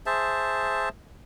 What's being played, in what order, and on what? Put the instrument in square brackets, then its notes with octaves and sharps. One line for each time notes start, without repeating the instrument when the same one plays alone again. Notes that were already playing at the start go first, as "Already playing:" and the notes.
[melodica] G#4 C5 E5 A5